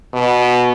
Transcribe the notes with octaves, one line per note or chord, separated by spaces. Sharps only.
B2